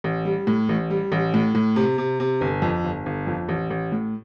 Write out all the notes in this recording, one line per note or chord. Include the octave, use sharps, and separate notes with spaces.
A1
G3
A2
A1
G3
A1
A2
A2
C3
C3
C3
G1
F2
G1
G1
F2
A1
A1
A2